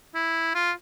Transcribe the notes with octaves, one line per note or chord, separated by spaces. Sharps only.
E4
F4